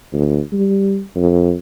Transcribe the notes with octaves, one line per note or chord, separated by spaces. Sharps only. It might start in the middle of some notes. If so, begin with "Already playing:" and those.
D2
G3
F2